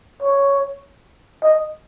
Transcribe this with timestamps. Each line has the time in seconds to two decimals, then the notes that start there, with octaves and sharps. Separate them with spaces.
0.22 C#5
1.43 D#5